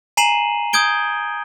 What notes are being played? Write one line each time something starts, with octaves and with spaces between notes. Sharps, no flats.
G#5 A#5 C7 D#7 E7 F#7
D#6 G6 G#6 D7 G7